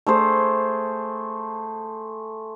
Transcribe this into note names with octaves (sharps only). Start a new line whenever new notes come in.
A3 G#4 C5